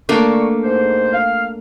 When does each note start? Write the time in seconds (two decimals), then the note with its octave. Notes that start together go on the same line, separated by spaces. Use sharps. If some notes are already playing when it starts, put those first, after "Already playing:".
0.09 D3 A3 A#3 D4 C#6
0.64 G#2 C5
1.13 F5